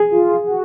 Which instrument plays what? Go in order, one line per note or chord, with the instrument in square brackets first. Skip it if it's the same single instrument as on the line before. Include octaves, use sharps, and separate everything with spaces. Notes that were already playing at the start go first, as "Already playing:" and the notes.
Already playing: [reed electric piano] G#4
[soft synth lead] F4
F#4